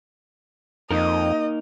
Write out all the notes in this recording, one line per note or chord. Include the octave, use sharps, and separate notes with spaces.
F2 A#3 D#4 A#4 D#5